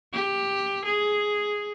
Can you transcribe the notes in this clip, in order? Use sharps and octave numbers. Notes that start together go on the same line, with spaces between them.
G4
G#4